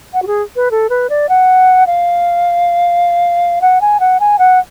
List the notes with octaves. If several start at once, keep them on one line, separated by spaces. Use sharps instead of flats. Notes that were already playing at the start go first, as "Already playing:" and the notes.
F#5
F#4
G#4
B4
A4
B4
D5
F#5
F5
F#5
G#5
F#5
G#5
F#5